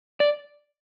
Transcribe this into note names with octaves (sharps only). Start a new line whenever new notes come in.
D5